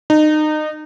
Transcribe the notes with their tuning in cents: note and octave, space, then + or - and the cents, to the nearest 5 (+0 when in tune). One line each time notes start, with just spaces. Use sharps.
D#4 -25